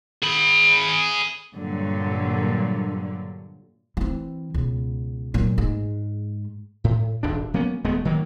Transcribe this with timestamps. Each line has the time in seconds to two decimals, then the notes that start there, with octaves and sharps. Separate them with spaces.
0.22 G#4 B5
1.56 G2 A#2 D3 F#3
3.97 E3 C4
4.54 C#2 B2
5.34 A#2 F#3
5.58 G#2 G#3
6.84 A2
7.23 D#1 G#1 D4
7.54 F#3 A#3 B3 C#4
7.84 D#1 G#3 A3 B3
8.05 D#3 F#3 A#3